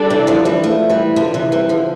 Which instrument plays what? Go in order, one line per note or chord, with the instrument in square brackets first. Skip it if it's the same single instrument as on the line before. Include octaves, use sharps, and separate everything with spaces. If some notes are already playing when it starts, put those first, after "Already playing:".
Already playing: [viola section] G3 D4 A4 D5
[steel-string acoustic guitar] C3 E3
D3 F3
E3 G3
F3 A3
E3 G3
D3 F3
C3 E3
E3 G3
D3 F3